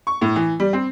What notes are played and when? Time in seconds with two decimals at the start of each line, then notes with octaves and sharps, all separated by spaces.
0.07 C#6
0.21 A2
0.36 E3
0.60 G3
0.73 C4